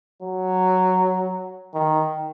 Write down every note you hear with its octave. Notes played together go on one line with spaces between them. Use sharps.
F#3
D#3